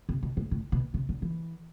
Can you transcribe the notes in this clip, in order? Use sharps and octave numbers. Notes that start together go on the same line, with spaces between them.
C3
B2
A2
A2
B2
C3
D3
E3